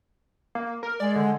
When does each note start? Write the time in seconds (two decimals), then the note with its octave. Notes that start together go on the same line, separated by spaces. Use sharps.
0.55 A#3
0.83 A#4
1.00 G#3 D5
1.16 D3